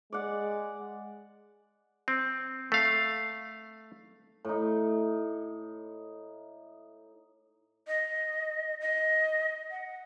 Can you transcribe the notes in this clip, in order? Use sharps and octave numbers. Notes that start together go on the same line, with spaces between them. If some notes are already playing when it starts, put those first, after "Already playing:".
G#3 D5 F#5
C4
A3 F5
A2 D#4
D#5
D#5
F#5